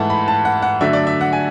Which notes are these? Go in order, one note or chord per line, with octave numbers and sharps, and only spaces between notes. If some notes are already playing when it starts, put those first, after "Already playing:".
Already playing: G#2 E3 A3 F#5 A5
B5
A5
F#5
F#5
D3 F#3 A3 D4 E5
D5
E5
F#5
G#5